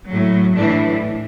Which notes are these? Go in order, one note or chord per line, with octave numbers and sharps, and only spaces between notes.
A2 F#3
A2 E3 D4